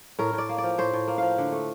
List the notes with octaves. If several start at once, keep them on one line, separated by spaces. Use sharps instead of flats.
A2 A#4
A2 D5
A#3
D5
F3
A2 C5
A2
A#3
F3 F5
D3
A3